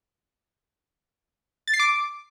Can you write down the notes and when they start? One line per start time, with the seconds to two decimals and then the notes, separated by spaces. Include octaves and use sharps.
1.68 A6
1.74 C7
1.80 D6